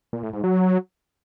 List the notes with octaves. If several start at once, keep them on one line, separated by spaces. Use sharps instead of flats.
A#2
A2
G#2
F#3